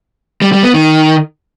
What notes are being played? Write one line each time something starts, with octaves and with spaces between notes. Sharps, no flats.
G3
G3
B3
D#3